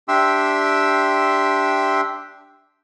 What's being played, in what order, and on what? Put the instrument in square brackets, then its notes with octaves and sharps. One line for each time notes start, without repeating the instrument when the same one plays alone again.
[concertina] D4 G4 E5 G5 C6 E6